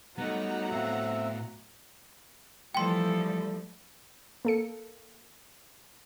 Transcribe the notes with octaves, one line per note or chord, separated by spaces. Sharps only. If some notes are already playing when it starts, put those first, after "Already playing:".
F#3 G3 A3 B3 D#4 F#5 A#5
A2 C4 E5 F5
E3 F3 G3 A3 A4 G5 C6
A#3 A4 C#7